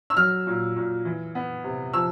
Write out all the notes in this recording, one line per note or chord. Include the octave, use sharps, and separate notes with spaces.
E6
F#3 F6
A#2
A#2
E3
B3
C3
F3 E6